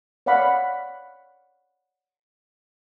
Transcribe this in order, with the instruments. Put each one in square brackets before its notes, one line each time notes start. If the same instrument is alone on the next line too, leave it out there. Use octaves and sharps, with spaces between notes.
[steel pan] C#5 D5 F5 F#5 B5